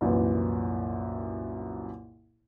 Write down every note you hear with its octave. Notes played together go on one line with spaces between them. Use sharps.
C2 F#2 A#2 E3